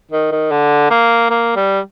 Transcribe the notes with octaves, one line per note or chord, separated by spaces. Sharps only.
D#3
D#3
D3
A#3
A#3
G3